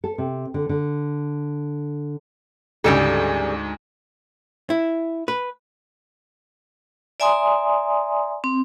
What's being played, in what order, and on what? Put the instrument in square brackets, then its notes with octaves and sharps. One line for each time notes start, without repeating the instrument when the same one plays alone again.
[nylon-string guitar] A4
C3
D3
D3
[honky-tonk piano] D2 G#2 [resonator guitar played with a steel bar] C#3 G3 A4
[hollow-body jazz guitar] E4
B4
[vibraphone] D5 E5 G#5 A#5 C6 D#6
C4